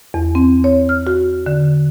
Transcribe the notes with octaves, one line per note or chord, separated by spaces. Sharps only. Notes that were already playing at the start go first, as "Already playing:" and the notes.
E2
C4
C#5
F6
F#4
D3